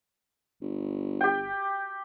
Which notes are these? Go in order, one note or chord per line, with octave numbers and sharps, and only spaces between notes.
G1
G4 G5